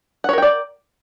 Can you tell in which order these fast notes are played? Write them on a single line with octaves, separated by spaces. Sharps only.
F#5 C#5 A#4 G5 D5